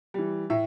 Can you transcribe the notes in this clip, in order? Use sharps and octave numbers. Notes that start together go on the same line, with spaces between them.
E3 G3
A2 E5